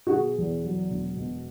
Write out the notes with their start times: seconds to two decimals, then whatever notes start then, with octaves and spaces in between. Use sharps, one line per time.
0.07 F#4
0.12 B2 G#4
0.38 E2
0.64 F#3
0.90 E1
1.16 B2